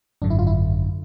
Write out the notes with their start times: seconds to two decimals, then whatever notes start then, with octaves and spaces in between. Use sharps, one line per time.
0.22 G#1 F#2 D3 D4
0.30 E4
0.39 F4
0.47 E4